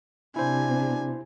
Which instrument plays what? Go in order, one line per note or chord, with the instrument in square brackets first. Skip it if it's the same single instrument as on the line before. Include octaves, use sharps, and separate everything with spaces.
[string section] C3 [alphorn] D4 [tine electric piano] E4 C5 [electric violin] G#5